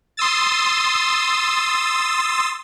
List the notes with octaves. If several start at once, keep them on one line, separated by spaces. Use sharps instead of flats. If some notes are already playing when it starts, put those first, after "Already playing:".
C6 D#6 E6 A6